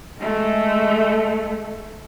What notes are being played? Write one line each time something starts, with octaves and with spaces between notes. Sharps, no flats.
G#3 A3